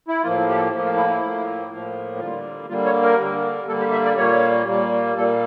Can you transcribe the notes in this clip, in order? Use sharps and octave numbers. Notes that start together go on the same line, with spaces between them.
E4
A2 F3 A#3 F4
G4
A4
A2 F3 A#3
F4
E4
E4
A2 F3 A#3
A2 F3 A#3
D3 G3 A#3 F4
D3 G3 A#3 F4
C#5
A#4
D3 G3 A#3
D3 G3 A#3 A4
G4
E5
D5
A#2 G3 A#3 C#5
A#2 G3 A#3
A#2 G3 A#3 A4